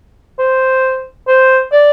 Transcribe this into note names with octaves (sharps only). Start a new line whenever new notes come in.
C5
C5
D5